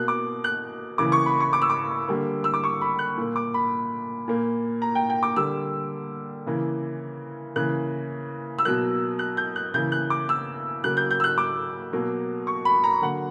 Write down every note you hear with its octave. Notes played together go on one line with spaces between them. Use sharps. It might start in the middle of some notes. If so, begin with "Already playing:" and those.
Already playing: B2 A#3 F#6
D6
F#6
C#3 E3 A#3 D6
C#6
B5
C#6
D6
E6
D6
D3 G3 A#3
E6
D6
C#6
B5
F#6
A#2 A#3
D6
B5
A#2 A#3
A#5
G5
G5
D6
D3 G3 A#3 E6
C#3 E3 A#3
C#3 E3 A#3 F#6
E6
B2 F#3 A#3 F#6
F#6
G6
F#6
C#3 E3 A#3 G6
F#6
D6
E6
C#3 F#3 A#3 F#6
G6
G6
E6
F#6
D6
B2 F#3 A#3
C#6
B5
A#5
D3 F#3 A#3 F#5